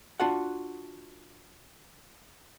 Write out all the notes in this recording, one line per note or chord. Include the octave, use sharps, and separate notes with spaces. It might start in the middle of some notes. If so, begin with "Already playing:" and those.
D4 F4 F#4 F#5